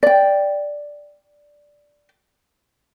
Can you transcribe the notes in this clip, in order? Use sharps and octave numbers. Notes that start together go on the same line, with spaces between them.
D5 G5